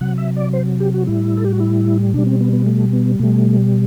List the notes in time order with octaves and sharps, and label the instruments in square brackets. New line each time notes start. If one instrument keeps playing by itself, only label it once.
[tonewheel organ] C3 F#3 F#5
E5
D5
C5
G4
F#4
A2 G3 E4
A4
G4
F#4
E4
B2 G3 D4
C4
B3
B3
A3
B3
B2 G3 A3